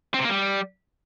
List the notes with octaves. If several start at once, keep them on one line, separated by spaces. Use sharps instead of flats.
C4
C3
A#3
G3